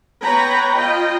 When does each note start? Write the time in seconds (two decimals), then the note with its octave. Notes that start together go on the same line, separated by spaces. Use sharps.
0.21 B3 B4 C#5 G5 A#5 B5
0.76 F4 D#5 G5